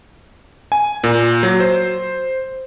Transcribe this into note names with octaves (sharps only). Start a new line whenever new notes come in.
G#5
A#2
F#3
C5